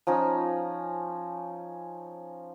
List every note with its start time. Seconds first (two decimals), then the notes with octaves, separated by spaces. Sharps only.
0.07 F3 C#4 D#4